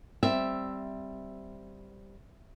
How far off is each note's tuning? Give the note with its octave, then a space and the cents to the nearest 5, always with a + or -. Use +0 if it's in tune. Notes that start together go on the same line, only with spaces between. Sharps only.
G3 +0 C4 +0 E5 +0